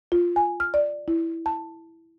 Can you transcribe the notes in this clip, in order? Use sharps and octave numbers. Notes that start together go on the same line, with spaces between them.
F4
G#5
F6
D5
E4
A5